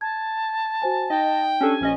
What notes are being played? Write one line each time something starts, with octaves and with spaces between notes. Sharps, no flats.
A5 G#6
F#4 C5 G#5
D#4 D#5 G5
C#4 D4 G4 A4 G#5
A#1 C#4 D#5